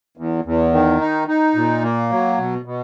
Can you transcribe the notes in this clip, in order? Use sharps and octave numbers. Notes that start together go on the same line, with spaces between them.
E2
E2
D#3
D#4
D#4
A#2
A#3
F#3
B2
B2